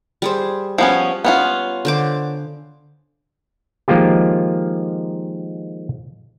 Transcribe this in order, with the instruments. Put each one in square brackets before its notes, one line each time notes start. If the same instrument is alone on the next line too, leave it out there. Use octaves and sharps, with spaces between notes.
[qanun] G3 G#4 C5
[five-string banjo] F3 B3 C#4
B3 C#4 F4
[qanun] D3 C5 D6
[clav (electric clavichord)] D#3 F3 G#3 A#3 F4 G4